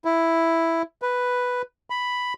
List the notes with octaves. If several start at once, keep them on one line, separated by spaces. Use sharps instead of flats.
E4
B4
B5